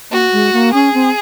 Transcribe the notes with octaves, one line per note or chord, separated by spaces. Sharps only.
A#3 F#4
G#3
A#3
C#4 G#4
C4